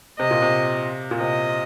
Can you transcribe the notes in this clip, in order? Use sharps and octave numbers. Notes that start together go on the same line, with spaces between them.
C3 D#5
A#2
C3
A#2
C3 D#5